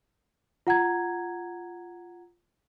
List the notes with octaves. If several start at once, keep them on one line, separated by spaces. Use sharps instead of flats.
F4 F#5 A#5 G#6